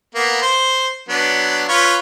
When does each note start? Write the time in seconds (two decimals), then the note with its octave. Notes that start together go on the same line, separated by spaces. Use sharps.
0.15 A#3 B3
0.42 C5
1.09 F#3 B3 D4
1.68 F4 B4 C#5